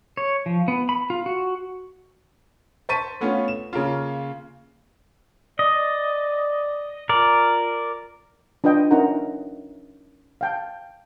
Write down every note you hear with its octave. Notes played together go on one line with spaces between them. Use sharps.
C#5
F3
B3
B5
F4
F#4
C5 A5 C#6 A6 B6 D#7
A3 B3 C#4 F4
E7
C#3 A#3 C#4 F4
D5 D#5
F4 A#4 D5
D4 F4 B4 D#5 G5
C#4 D#4 E4 A#4 F#5 A#5
F5 G5 A5